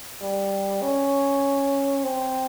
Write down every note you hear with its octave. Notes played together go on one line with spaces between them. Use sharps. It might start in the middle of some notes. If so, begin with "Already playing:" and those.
G3
C#4
C4